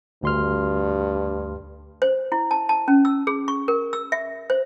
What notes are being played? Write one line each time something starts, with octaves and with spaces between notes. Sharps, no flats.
D2 G2 C6 F6
C5
E4
A5
A5
C#4
E6
G#4
C#6
A#4
E6
E5
C5